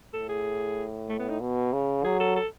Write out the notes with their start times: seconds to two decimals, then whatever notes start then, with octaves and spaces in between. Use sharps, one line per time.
0.13 A2 A4
0.29 G#4
1.09 A3
1.19 B3
1.30 D#4
1.41 B2
1.73 C#3
2.04 F#3 G#4
2.20 A4
2.36 A4